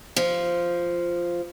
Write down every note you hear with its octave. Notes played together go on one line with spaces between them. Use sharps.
F3